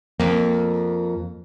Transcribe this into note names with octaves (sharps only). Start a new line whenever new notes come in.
F2 A#3